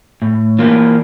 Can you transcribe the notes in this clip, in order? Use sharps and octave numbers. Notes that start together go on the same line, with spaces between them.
A2
E3 A#3 F4